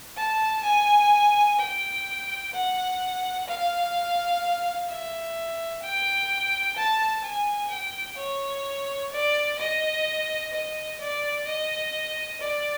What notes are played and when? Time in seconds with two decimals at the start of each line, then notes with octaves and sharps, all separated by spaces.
0.16 A5
0.63 G#5
1.58 G5
2.52 F#5
3.47 F5
4.88 E5
5.82 G5
6.76 A5
7.23 G#5
7.70 G5
8.17 C#5
9.12 D5
9.58 D#5
10.53 D#5
11.00 D5
11.46 D#5
12.40 D5